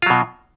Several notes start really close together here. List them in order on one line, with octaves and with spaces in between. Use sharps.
F4 F#3 B2